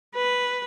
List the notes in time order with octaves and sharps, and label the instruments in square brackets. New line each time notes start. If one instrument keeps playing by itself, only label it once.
[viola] B4